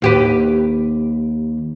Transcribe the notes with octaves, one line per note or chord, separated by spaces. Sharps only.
D#2 G4 B4